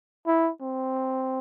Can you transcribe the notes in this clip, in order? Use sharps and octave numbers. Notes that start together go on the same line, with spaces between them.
E4
C4